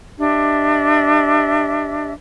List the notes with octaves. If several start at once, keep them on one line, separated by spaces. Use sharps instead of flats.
D4 G4 D#5 E5